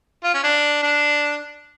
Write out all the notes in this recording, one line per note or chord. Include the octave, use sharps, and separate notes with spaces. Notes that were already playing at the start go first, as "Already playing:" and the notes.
F4
C#4
D4
D4